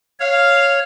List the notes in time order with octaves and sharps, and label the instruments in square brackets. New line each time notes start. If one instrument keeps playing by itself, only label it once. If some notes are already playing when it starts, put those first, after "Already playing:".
[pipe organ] C#5 [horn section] F5